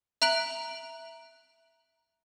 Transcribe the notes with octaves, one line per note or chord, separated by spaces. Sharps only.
E5 A#5 F#6 D7 F#7